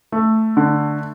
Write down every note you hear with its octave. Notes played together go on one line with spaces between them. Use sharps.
A3
D3